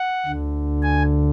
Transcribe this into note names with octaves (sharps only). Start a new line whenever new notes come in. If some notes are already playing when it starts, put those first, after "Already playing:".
Already playing: F#5
D2 D3
G#5